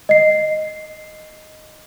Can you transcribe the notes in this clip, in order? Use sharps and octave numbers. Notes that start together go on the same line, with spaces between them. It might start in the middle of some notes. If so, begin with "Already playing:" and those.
D#5 C7